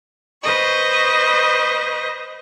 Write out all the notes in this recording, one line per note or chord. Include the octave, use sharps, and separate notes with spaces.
B4 C5 D#5 C#6